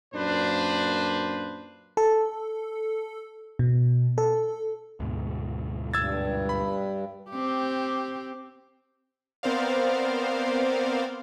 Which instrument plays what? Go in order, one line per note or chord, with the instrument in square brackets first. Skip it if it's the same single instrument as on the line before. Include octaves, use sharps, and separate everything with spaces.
[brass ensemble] F#2 A#2 A#3 D4 B4 C5
[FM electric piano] A4
B2
A4
[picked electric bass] D2 G#2 B2
[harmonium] G2 [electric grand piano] E6 G#6 A6
[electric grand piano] B5
[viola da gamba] C4 G4
[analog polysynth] B3 C4 A#4 C5 D5 F5